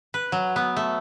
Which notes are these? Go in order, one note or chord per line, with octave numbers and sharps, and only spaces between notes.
B4
F#3
B3
A3